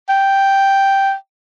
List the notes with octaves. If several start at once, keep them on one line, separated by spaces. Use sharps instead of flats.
G5